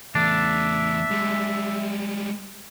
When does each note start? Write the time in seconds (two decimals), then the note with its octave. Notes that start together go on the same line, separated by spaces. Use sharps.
0.15 E2 A3 D4 E5
1.10 G3 G#3